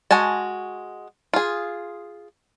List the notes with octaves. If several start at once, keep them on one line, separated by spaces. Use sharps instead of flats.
G#3 F#4 G#5 A5
F4 G#4